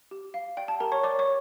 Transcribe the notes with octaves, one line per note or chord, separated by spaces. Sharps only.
G4
F5
D5 G5
A5
G4 A#4 A#5
C#5 C#6
C#5 D5 D6
C#5 C#6